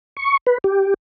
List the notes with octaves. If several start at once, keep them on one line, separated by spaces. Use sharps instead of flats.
C#6
B4
G4